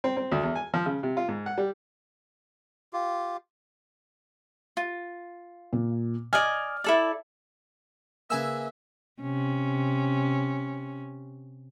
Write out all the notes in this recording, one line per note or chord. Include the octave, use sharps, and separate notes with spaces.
C4
C4
D2
E2
G#5
F3
C#3
C3
F4
G#2
F#5
G3
F4 G4
F4
A#2
D5 D#5 G#5 F6
E4 A4 D5
C#3 A#3 G#4 B4 E5 G#5 E6
C3 C#4